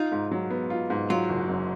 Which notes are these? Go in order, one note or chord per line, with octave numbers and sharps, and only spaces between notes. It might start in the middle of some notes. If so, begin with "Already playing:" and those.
Already playing: D#4 F4
G#2
F#3
B3
F4
G#2
F#3 F4
F#1
F#2